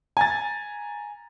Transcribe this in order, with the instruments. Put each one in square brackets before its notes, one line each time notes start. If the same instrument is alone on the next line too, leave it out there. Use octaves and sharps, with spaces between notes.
[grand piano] G#5 A#5 A6